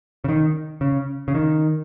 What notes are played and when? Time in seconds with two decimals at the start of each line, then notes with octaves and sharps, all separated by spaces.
0.24 C#3
0.29 D#3
0.81 C#3
1.28 C#3
1.35 D#3